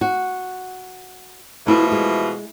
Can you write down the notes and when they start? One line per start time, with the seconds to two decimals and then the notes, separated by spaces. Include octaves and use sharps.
0.01 F#4
1.67 B2 E3 F3 A3 E4
1.92 G#3